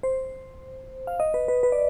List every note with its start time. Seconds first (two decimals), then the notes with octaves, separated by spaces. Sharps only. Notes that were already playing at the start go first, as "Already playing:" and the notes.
0.03 C5
1.07 F5
1.20 D#5
1.34 B4
1.48 B4
1.63 B4
1.72 D5